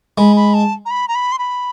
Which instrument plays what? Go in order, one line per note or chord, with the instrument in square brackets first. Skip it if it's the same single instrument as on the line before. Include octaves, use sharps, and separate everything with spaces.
[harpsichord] G#3 [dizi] B5
[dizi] B5
A5
A#5
B5
A#5
B5
C6
B5